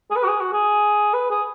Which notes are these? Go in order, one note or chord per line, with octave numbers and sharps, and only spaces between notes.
G#4
B4
F#4
G#4
F#4
G#4
B4
G#4